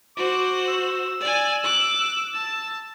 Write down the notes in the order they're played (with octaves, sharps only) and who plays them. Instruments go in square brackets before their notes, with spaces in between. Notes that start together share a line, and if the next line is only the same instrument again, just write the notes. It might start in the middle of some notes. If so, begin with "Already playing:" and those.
[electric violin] F#4 C5 [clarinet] D6
[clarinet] E6
[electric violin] D5 G#5
D6 F#6
A5